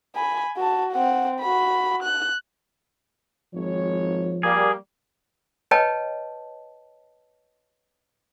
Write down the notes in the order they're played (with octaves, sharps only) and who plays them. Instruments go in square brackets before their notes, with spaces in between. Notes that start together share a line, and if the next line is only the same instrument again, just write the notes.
[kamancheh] G#5 B5
F#4 A5
C4 F#5
F#4 B5
F#6
[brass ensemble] G#1 C#5 [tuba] F3
[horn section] G3 A#3 [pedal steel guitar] G#4
[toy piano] B4 C#5 D#5 G5 A5